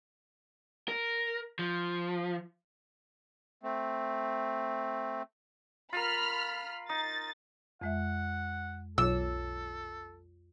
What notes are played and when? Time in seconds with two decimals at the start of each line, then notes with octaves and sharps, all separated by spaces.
0.88 A#4
1.59 F3
3.63 A3 C4
5.93 F4 A#4 B5 F6
6.89 D#4 A6
7.81 F2 G#3 E5 F#5
8.98 B1 F4 A4 C#5 E6